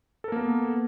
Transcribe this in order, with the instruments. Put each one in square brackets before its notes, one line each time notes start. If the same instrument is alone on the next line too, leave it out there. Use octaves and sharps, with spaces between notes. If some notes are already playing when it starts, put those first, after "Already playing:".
[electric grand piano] A4
A#4
A#3
B3